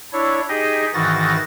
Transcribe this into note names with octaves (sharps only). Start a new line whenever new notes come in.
D4 E4 C#5
D#4 G4 G#4 D#5
G#2 D#3 E3 F#4 A6 A#6